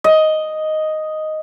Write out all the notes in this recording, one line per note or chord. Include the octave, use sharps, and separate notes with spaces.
D#5